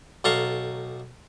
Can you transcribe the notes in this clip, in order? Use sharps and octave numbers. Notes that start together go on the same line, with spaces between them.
B1 A4 F5 A#5 C#6